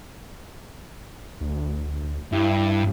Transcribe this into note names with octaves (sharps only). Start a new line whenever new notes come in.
D2
G2 E4